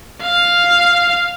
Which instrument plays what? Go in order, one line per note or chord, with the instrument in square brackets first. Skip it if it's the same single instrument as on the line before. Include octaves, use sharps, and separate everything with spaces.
[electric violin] F5